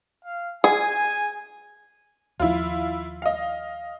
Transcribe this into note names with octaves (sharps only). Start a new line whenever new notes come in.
F5
G#4 G#5
D#2 F3 E4 F4
D#5 F5